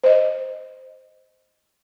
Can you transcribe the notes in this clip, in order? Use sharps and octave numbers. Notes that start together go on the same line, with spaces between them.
C5 D#5